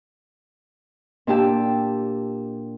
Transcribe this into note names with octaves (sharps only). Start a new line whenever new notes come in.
A#2 D4 G4 A5 E6